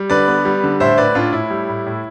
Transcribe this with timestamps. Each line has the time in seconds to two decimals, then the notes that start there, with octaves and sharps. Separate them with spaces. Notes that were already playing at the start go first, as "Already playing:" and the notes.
Already playing: G3
0.10 D3 B4 D5
0.27 B3
0.45 G3
0.64 D3
0.80 A2 C5 E5
0.98 A2 B4 D5
1.15 A2 D4 F4
1.33 A2 E4
1.50 G3
1.69 A2
1.86 A2